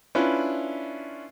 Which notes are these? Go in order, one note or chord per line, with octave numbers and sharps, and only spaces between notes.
C#4 D4 E4 F4 B4